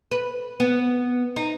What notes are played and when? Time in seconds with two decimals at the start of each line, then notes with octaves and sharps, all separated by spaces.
0.11 B4
0.60 B3
1.36 D#4